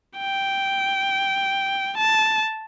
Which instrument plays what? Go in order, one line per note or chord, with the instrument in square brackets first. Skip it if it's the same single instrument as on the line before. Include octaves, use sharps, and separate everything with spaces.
[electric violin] G5
A5